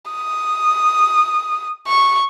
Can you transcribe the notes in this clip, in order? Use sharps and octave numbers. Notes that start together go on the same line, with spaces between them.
D#6
C#6